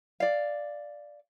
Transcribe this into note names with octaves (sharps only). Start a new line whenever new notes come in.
D5 F5